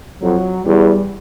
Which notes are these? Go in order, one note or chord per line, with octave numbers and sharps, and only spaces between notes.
F2 F#3
E2 G3